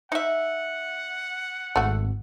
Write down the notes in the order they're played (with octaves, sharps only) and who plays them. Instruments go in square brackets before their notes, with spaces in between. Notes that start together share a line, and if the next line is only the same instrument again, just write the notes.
[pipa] D#4 E5 [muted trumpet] F#5
[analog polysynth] G#1 [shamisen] A3 F#4